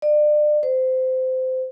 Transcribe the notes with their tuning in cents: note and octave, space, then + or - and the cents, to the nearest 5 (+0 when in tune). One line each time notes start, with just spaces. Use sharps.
D5 +30
C5 -20